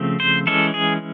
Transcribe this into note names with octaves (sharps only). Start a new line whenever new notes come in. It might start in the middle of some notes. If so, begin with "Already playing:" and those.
Already playing: C#3 F3 A3 C4
C5
E3 G#3 C#4 A4
G#4